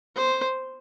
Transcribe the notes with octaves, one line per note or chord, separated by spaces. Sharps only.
C5